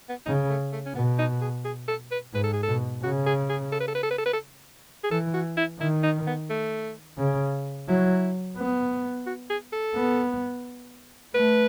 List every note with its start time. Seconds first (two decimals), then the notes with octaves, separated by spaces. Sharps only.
0.09 B3
0.26 C#3 D#4
0.49 A3
0.72 A3
0.85 C#4
0.95 B2 B3
1.19 D#4
1.41 G#4
1.65 G#4
1.88 A4
2.11 B4
2.34 G#2 B4
2.44 A4
2.53 G#4
2.63 A4
2.68 B2
3.03 C#3 F#4
3.26 G#4
3.50 G#4
3.72 A4
3.80 B4
3.88 A4
3.95 B4
4.03 A4
4.11 B4
4.18 A4
4.26 B4
4.33 A4
5.04 G#4
5.11 E3 A4
5.34 F#4
5.57 E4
5.80 D#3 E4
6.03 D#4
6.27 B3
6.50 A3
7.18 C#3
7.88 F#3 E4
8.58 B3
9.27 F#4
9.50 G#4
9.72 A4
9.95 B3
11.34 A3 B4